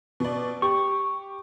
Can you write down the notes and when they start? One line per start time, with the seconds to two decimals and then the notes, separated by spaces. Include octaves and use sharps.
0.20 B2 D5
0.62 G4 C#6